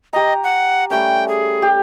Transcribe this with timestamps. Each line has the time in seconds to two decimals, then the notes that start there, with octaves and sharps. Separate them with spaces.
0.13 G4 D#5 A#5
0.44 F#5
0.90 G3 A3 C#4 G5
1.28 G#4
1.62 G4